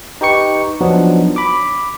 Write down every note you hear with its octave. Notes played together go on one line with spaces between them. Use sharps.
D#4 G4 B4 G5 C#6 C#7
F3 F#3 B3 D4 D#4
B5 D6